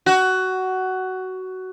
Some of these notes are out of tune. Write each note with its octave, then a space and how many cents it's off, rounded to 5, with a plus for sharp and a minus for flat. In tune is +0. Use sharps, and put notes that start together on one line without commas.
F#4 +15